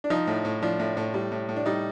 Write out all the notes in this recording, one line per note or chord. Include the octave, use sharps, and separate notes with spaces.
D4
F3 D#4
A2
A2
F3 D4
A2
A2
G3
A2
A2
D4
G3 D#4